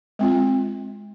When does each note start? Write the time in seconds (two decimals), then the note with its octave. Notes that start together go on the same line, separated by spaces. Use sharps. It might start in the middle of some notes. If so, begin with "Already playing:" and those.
0.19 G#3 C4 F4